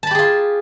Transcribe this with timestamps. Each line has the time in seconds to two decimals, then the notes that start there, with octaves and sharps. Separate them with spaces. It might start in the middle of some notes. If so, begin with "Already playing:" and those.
0.03 A5
0.07 B5
0.11 G4
0.15 G#4
0.19 F4